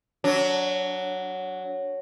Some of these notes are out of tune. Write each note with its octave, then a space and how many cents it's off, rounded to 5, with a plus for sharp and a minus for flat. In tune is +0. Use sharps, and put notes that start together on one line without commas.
F#3 +0 D4 -30